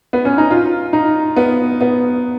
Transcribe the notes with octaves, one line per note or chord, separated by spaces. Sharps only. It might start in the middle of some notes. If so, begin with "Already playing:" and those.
B3
C#4
D#4
F4
D#4
B3
B3